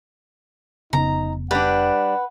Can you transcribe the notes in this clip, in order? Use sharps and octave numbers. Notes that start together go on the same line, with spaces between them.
F1 C#3 B3 D#4 A#5
G3 D4 B4 F#5